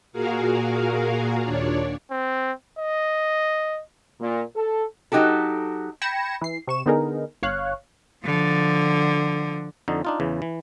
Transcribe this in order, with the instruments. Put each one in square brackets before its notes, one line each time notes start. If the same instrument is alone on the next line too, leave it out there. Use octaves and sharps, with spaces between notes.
[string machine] A#2 F#4 G#4 A#4 F5
D#2 A#2 D4 C#5 D5
[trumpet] C4
D#5
[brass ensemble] A#2
A4
[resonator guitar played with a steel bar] F#3 D#4 F#4 G4 A4
[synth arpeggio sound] G5 B5 G#6 A#6 C#7 E7
E3 C7
C3 C#6 E7
D3 B3 D#4 G#4 A#4
G1 C#5 F5 F#6
[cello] D3 F3
[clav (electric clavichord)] F2 D3 D#4
D4 D#4 F4
E2 C#3 E3
E3